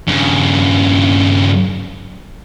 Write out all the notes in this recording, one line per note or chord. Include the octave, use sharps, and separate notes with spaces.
G2 C#3